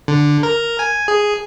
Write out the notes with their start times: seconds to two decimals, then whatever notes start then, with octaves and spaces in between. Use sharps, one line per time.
0.08 D3
0.43 A#4
0.79 G#5
1.08 G#4